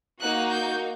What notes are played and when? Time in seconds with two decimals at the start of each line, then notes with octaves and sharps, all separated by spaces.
0.22 A#3 D#4 F#4 F#6
0.52 G6